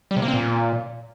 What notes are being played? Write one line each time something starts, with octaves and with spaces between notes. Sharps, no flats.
G3
C3
A#3
C4
A#2